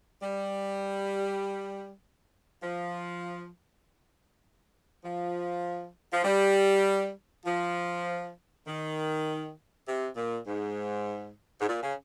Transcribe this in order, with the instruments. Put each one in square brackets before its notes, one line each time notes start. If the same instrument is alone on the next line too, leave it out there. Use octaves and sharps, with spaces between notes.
[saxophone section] G3
F3
F3
F3
G3
F3
D#3
C3
A#2
G#2
G#2
A#2
C#3